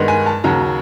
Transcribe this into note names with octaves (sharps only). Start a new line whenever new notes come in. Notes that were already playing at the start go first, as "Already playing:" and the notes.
Already playing: G2 D#3 G#3 B3
G#5
A5
D#2 C#3 F#3 A#5